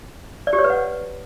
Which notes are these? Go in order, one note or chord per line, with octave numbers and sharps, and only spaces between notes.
D5
G4
C#5
B4
F#5